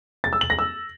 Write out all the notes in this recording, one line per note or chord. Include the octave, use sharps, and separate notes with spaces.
A6
E6
F#7
A#6
E6